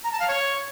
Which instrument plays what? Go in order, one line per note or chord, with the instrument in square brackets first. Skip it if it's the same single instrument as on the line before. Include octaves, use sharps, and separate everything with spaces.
[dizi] A#5
A5
F5
C#5